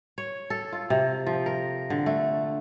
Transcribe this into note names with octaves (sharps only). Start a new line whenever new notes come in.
C#5
A4
F4
C3
F3
A#4
D3
A3